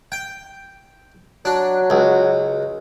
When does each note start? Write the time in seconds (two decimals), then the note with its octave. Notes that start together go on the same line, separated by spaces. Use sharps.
0.12 G5
1.45 F#3 D4
1.90 C#2